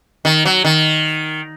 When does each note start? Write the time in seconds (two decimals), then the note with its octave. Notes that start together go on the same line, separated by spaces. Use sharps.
0.25 D#3
0.45 F#3
0.65 D#3